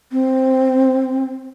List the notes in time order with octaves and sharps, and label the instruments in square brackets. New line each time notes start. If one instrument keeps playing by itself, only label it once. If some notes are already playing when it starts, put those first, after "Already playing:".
[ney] C4